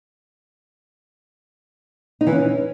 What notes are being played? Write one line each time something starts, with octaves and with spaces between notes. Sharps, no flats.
D#4
E3
C#4